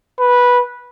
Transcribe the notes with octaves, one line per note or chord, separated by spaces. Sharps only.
B4